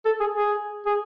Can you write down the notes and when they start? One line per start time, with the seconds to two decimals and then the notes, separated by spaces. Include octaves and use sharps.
0.06 A4
0.20 G#4
0.35 G#4
0.86 G#4